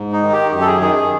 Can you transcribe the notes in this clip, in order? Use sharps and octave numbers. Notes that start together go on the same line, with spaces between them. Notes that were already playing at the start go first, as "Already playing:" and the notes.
Already playing: G#2
D#4
D#3
G4
F#2 G4
A4
G#4
D#3 G#4
G#4